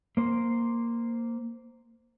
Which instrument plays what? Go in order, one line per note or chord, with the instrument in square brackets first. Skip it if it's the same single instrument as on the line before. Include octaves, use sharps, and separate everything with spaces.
[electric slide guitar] A#3 C5